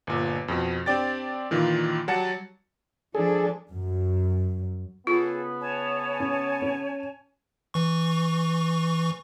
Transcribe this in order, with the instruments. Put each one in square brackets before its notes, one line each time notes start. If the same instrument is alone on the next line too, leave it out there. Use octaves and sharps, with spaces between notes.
[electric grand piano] G1 A#2
F2 B2
C4 D4 G4 D5 G5 A6
A#2 D#3 E3 F4
F#3 G3 F#5 A5 A6 C#7
[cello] F3 D4 [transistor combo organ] G#4 A4
[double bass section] F#2
[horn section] C#3 B3 [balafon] F4 [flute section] G#4 A4
[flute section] C#5 G#5 A5
[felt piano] C#4
C#4
[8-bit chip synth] E3 C#6